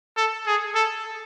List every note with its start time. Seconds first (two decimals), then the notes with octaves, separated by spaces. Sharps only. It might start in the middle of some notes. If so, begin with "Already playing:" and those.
0.17 A4
0.47 G#4
0.75 A4